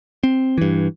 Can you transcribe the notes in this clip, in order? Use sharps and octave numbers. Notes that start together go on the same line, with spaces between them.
C4
G2 E3